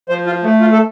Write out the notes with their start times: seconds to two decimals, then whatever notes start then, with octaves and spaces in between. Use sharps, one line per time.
0.09 F3 C5
0.26 F4
0.43 A3
0.61 F4
0.72 A4